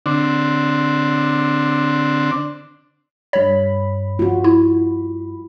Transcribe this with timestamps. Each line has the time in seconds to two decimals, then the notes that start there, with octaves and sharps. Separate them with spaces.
0.06 D3 C4 D4
3.33 G2 C#5 B5
4.19 F4 F#4
4.44 E4